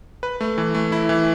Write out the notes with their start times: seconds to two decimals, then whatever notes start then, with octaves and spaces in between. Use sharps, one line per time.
0.23 B4
0.41 A3
0.58 E3
0.75 A3
0.92 E4
1.09 E3